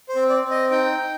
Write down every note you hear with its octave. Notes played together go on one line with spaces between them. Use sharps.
C5
C4
D5
C4
D#5
D#4 G5
D#4